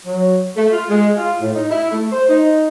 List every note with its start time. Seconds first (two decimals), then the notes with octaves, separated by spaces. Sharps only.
0.07 F#3
0.57 A3
0.72 F4
0.90 G#3
1.17 F4
1.41 A2
1.55 D#4
1.71 E4
1.91 A3
2.11 C5
2.29 D#4